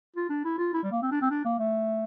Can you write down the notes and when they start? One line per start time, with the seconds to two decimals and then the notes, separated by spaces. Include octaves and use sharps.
0.16 F4
0.30 D4
0.45 E4
0.58 F4
0.74 E4
0.83 G3
0.92 A#3
1.02 C4
1.11 D4
1.21 C4
1.30 D4
1.45 A#3
1.59 A3